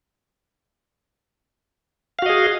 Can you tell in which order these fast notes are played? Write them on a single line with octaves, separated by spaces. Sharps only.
F5 F#4 D#5 G#4